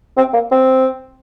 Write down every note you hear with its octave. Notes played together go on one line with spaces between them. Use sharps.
C4
A#3
C4